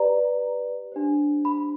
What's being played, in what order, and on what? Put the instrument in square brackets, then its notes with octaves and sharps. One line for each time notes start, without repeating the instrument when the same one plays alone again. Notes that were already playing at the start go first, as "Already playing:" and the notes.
Already playing: [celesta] G4 B4 D5 A#5
D4 G4 C5
B5